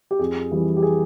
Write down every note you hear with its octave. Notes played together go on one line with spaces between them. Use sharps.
G4
F2 G#4
E3 G3
G4
G#4